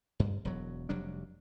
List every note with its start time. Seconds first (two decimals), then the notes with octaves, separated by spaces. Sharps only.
0.20 G2
0.45 E1 F#3
0.89 F1 F#3 G3 D4